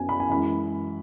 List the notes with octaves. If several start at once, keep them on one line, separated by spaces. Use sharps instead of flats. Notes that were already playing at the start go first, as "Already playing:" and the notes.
Already playing: F#2 F#3 B3 G#5
B5
G#5
F#2 E3 G#3 B5